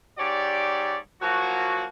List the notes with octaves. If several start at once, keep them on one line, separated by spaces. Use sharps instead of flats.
G#2 G4 C#5 D5
F3 F#3 A#3 F#4